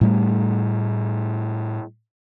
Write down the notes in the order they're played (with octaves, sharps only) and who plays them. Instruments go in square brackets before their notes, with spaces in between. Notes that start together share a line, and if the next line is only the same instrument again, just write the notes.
[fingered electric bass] A2 G3 A3